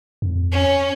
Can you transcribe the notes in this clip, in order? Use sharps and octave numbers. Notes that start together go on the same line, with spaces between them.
F2
C#4